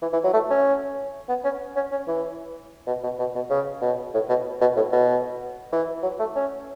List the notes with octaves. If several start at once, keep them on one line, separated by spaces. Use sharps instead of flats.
E3
E3
F#3
A3
C#4
B3
C#4
C#4
C#4
E3
B2
B2
B2
B2
C#3
B2
A2
B2
B2
A2
B2
E3
F#3
A3
C#4